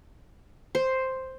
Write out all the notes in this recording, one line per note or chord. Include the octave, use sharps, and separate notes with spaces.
C5